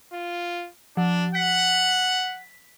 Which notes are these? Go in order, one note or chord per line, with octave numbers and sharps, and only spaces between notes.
F4
F3 D4
F#5 B6